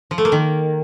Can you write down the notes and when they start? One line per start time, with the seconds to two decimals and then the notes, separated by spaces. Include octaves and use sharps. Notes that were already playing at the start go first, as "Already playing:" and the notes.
0.11 F3
0.18 A3
0.25 A#3
0.32 D#3